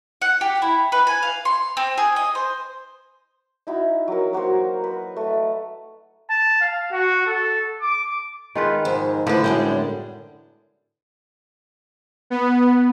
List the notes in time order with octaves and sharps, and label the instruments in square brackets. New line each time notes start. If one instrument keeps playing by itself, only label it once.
[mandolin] F#5
G4
E4
B4
G#5
F5
C6
C4
G#4
D#5
C5
[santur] D#4 E4 F#4
F#3 A#4
A#3 F#4 A#4 C5
B4
A3 D#5
[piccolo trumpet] A5
F5
F#4
A4
D6
[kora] D#3 F4 B4 [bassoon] G#3
[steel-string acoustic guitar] F2 [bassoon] G#2
[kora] A2 D3 B3 [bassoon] F3 [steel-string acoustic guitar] E4 B4
[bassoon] F#2 [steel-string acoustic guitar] G3 G#3 D4 [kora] G5
[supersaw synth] B3